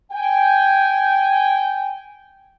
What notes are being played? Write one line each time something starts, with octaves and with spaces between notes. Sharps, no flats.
G5 G#5